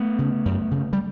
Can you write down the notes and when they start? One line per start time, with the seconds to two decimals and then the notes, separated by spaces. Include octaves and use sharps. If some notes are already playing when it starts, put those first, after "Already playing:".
Already playing: A3 B3
0.19 C#3
0.46 F#2
0.71 C#3
0.93 G3